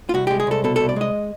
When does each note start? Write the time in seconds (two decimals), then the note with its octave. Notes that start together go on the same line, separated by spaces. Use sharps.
0.09 F4
0.14 C2 F#4
0.27 G#3 G4
0.40 G#4
0.47 C2 A4
0.64 B2 A4
0.76 C2 A4
0.89 D5
0.96 G#3 D#5